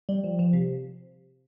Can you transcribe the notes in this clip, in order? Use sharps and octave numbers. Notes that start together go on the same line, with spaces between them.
G3
F3
F3
C3